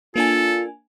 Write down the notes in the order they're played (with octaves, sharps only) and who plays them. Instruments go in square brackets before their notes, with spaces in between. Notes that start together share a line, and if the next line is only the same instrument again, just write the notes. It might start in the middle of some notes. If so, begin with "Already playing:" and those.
[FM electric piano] A#3 D4 G#5 [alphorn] F4 [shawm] A4